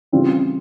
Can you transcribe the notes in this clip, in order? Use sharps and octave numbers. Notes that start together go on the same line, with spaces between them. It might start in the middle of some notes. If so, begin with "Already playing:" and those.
C#3 E3 G3 C4 F4